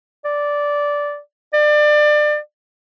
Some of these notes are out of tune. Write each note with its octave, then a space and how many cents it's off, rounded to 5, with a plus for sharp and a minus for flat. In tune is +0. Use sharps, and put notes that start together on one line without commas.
D5 -10
D5 +30